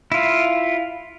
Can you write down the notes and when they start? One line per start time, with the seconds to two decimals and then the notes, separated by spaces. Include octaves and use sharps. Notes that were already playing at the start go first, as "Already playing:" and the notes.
0.12 E4 F4